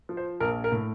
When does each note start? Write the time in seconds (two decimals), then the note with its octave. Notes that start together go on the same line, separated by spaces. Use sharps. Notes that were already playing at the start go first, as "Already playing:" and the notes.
0.09 F3
0.17 C5
0.40 A#1 A#4
0.64 A#4
0.72 A2